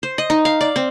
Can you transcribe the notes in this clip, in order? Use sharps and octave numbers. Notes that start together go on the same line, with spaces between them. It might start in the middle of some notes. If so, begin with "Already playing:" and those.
C5
D#5
D#4
F5
D5
C4